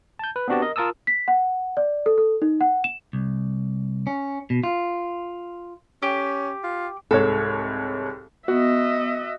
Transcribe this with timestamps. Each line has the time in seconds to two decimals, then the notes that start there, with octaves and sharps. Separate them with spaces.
0.19 A5 G6
0.36 B4
0.48 B3 C4 D4 F#4 G4 A5
0.62 A#4 D#5
0.76 F4 A#4 A5 D#6 E6
1.07 B6
1.28 F#5
1.77 D5
2.06 A4
2.18 A4
2.42 D#4
2.61 F#5
2.84 E7
3.13 C2
4.07 C#4
4.50 B2
4.64 F4
6.02 C#4 G4
6.64 F4
7.11 C2 G#2 A4 C#5
8.48 B3 F#4 D#5 E5